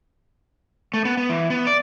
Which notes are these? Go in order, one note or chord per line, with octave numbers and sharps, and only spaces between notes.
A3
B3
B3
E3
B3
D5